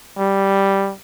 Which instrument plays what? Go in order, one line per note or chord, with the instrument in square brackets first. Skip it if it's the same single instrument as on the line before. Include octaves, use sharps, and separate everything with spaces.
[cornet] G3